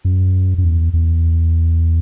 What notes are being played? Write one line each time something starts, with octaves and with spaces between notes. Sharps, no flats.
F#2
F#2
E2
E2